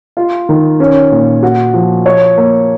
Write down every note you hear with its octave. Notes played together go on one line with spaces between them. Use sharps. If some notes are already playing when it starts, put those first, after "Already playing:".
F4
D#3
C#4
A#2
F#4
F3
C#5
A#3